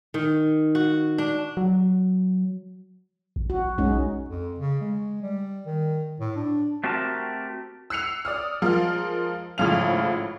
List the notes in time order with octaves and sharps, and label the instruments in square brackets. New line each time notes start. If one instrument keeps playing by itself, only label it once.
[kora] D#3
F#4
D4
[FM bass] F#3
[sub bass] A1
[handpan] F#4
[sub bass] B1 [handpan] G#3 C#4 D#4
[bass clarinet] F2
C#3
G#3
G3
D#3
A2
D4
[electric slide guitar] A3 C4 F#4 G4 A#4 A5
[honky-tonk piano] E6 F#6 C7 C#7 F7
D5 D#6 F6
F3 G#3 F4 A#4
G#1 A2 C#3 F3 F5 F7